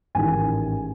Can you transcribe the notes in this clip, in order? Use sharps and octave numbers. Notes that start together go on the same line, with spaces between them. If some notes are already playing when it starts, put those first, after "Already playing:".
A1 G#2 D#3 G#5